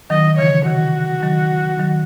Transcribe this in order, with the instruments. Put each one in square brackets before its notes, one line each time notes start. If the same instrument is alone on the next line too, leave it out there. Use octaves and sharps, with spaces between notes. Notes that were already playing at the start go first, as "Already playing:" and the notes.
[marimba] D#3 F#3 [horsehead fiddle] D#5
[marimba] C#3 E3 [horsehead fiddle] C#5
[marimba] C3 D#3 [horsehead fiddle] F#4
[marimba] D#3 F#3
D#3 F#3